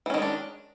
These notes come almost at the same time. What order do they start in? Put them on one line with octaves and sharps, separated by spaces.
E3 C#4 D#3 G#3 D4